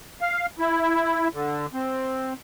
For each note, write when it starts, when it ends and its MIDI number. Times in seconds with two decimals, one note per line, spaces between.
0.21 0.46 77
0.59 1.28 64
1.34 1.66 50
1.74 2.33 60